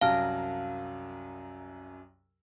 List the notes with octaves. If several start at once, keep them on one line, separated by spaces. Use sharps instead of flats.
C2 F#2 F#3 F5 A5 F6